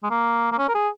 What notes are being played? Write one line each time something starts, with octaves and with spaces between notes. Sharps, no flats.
G#3
A#3
A#3
C#4
A#4
G#4